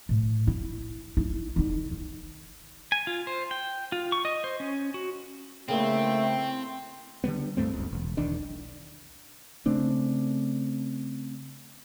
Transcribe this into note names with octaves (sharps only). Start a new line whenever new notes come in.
A2
E4
D#4 E4
D3 D#4
D#3
G#5
F4
C5
G5
F4
C#6
D#5
C5
C#4
F#4
C#3 A3 A#3 C4 E4 G5
D3 F#3 G3 B3
D2 G2 A3 C4
F#1 C#2
E1
B1 E2 D#3 D4
C#3 A3 C4 D4